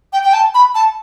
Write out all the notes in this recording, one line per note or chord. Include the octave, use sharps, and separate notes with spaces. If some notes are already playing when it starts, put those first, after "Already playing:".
G5
G5
A5
B5
A5